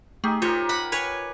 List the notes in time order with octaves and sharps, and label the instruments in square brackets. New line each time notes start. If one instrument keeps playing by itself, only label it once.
[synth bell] A3 [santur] D#4 G4 G#4
[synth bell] F4 [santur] G4 A#4 [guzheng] C5 C#5
[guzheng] F#5 B5
B4 C#5 G#5